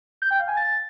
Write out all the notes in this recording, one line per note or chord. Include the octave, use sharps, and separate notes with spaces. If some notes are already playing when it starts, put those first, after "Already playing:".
G6
G5
F5
G#5
A6